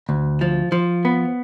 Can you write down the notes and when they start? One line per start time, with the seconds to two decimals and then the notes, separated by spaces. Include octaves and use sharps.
0.09 D2
0.41 F3
0.72 F3
1.05 B3